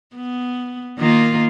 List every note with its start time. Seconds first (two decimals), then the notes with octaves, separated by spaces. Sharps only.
0.16 B3
0.98 D#3 A#3 F4